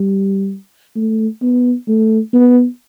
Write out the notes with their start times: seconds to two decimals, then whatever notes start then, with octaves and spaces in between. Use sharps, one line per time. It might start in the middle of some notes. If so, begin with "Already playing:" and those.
Already playing: G3
0.96 A3
1.42 B3
1.88 A3
2.33 B3